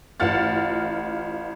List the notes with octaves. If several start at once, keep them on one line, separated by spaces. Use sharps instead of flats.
A1 F4 F#5 F6 A6